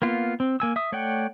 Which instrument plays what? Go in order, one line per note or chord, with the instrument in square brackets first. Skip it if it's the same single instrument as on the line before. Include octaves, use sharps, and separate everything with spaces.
[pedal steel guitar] A#3 B3 F4
C4
A#3 G#5 E6
E5 D#6
A3 C#5 D5 F#5 G5